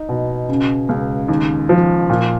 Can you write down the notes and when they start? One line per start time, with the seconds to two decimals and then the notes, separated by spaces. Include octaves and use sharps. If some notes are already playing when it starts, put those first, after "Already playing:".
Already playing: D#4
0.09 B2
0.49 C#3
0.89 C#2
1.28 D#2
1.69 F3
2.10 A#2